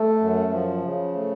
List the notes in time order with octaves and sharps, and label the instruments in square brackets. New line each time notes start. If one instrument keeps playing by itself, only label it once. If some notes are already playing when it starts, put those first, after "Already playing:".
Already playing: [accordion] A3
F#2
F3
C#3
A3